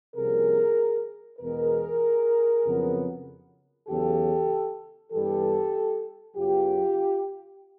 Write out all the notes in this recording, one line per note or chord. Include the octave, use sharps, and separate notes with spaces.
C2 C3 F3 A#3 C#4 G#4 A#4
E2 B2 G#3 B3 G#4 A#4
F2 C#3 F#3 B3
E2 C#3 F#3 G4 A4
G2 E3 G3 B3 G4 A4
F#2 C#3 F#3 B3 F4 G4